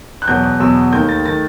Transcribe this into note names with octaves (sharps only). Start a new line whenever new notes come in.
F#6
E2 B2 F#3 B3 G6
F#6
E2 B2 F#3 B3 E6
D#2 D#3 A3 G6
A6
D#3 A3 A6